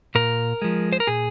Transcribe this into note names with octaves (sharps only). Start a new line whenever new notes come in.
A#2 A#4
F3 G#3
C5
A#4
A#2 G#4